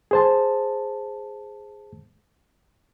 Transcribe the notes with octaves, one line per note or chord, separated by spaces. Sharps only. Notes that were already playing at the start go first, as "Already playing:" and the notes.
G#4 C5 A5